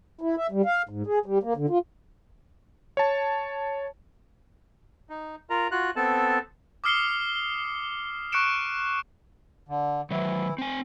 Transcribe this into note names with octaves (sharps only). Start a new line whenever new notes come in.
E4
E5
G3
F5
G#2
G#4
G3
A#3
D3
F4
C#5 A5
D#4
F4 A#4 A#5
F4 F#4 F#6
B3 C4 A4 A5
D6 D#6 F6 C7 C#7 G7
C#6 F#6 C#7 D7 E7
D3
D#3 E3 F#3 E4
C4 G#5